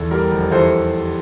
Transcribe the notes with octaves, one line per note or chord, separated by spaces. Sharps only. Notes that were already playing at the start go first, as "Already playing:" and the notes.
Already playing: E2 E3 A4
G3 A#4
F1
E3 A4 C5